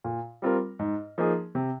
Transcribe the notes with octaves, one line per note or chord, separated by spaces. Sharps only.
A#2
G3 C4 F4 A#4
G#2
F3 A#3 D#4 G#4
C3